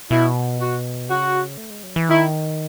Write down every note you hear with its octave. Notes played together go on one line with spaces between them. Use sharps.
B2 E4
F#4
C#3 F#4
A3
G#3
F#3
E3
D#3 E4